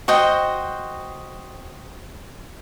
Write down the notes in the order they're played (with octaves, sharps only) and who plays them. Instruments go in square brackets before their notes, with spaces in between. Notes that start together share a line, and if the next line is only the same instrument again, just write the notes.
[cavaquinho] F#4 C5 D#5 G5